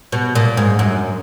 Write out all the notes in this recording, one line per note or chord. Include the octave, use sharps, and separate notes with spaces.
B2
A#2
G#2
F#2